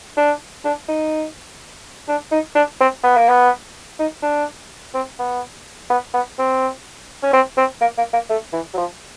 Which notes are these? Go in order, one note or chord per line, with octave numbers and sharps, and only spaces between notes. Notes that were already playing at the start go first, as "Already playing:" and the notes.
D4
D4
D#4
D4
D#4
D4
C4
B3
A#3
B3
D#4
D4
C4
B3
B3
B3
C4
C#4
C4
C4
A#3
A#3
A#3
A3
E3
F#3
F3